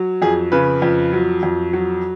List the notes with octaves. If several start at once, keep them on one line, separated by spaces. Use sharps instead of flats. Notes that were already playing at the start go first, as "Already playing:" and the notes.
Already playing: F#3
F2 G#4
C#3 B4
F2
F#3
F2
F#3